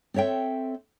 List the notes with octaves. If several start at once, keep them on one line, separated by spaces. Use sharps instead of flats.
C4 A4 C#5 E5 G5